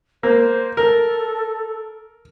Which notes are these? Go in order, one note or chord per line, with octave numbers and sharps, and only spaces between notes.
A#3 C5
A4 A#4